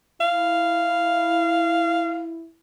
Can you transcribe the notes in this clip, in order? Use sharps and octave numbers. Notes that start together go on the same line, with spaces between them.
E4 F5